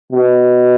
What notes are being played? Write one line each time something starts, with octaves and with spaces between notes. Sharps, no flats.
B2